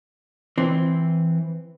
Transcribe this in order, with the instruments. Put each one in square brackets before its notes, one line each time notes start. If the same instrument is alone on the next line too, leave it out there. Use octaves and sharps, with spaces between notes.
[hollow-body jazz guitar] E3 C4